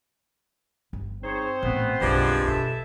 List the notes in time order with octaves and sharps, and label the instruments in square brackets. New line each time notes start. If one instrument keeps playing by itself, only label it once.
[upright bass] G1
[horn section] C4 C5 [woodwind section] D#4 G#4 C#5
[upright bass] A1 A#2 [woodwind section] A3 B3
[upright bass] F#1 B1 [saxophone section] G2 F3 G#3 [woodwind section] B3 B4 D5
[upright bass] B2 [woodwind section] A4 E5 A5